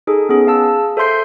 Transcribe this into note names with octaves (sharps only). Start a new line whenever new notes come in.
D#4 G#4 A4
B3 C#4 G#4
F5 A5 E6
A4 C5 E5 C6 G6 C7